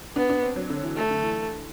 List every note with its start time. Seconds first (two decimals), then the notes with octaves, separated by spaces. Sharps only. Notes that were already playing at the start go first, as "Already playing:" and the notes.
0.16 B3 D4
0.30 D4
0.43 C4
0.56 F#3
0.70 D3
0.83 E3
0.96 A3
1.10 D3
1.23 E3